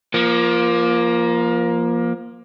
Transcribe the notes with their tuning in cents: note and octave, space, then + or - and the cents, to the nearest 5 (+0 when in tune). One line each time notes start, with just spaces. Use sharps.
F3 -10 A#3 +20